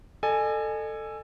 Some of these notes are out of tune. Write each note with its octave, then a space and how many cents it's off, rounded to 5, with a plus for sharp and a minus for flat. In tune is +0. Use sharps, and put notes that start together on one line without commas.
A4 +10 D#5 -45 G#5 +0